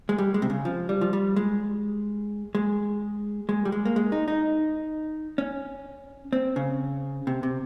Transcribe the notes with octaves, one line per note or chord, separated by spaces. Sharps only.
G#3
G3
G#3
C3
C#3
F3
G3
F3
G3
G#3
G#3
G#3
G3
G#3
A#3
G#3
D#4
D#4
C#4
C4
C#3
C3
C3